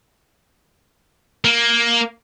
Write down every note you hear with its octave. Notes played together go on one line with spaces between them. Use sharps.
A#3